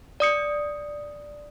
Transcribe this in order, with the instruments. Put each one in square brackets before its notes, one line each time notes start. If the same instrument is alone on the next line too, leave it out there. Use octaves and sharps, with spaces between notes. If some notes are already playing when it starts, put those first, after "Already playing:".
[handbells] D5 D#6 C#7